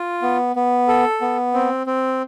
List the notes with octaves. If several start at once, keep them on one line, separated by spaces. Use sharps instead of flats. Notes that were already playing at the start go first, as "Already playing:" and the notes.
Already playing: F4
B3
B3
A4
B3
C4
C4